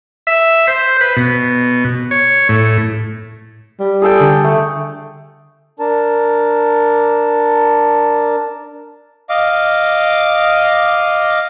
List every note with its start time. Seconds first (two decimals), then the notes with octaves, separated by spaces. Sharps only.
0.27 E5
0.68 C5
1.01 B4
1.16 B2
2.11 C#5
2.49 A2
3.79 G3
4.02 G#4 A4 G5
4.21 D3
4.44 A3
5.80 D4 A#4 A5
9.30 D#5 F5 D6